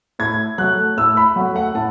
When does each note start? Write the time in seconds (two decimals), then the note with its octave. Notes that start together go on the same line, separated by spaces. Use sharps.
0.19 A2 G#6
0.58 F#3 A3 F#6
0.97 A2 E6
1.17 B5
1.36 F#3 A3 F#5
1.56 F#5
1.75 A2 A5